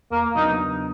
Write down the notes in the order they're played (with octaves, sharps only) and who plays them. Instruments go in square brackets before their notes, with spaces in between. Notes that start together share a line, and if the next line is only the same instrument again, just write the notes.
[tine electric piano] E2 [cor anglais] A#3
[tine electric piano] C#3 F#3 B3 D4 [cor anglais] D#4